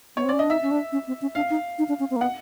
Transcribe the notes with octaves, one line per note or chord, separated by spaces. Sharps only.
B3 C#5
C4
C#4 D5
D4 D#5
D#4 E5
C#4
D4
C#4
C4
C#4
D4 F5
D#4
D#4
D4
C#4
C4
A#3
B3 F#5